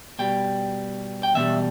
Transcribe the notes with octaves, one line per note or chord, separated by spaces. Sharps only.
B2 G3 G5
G5
E2 B2 G3 E5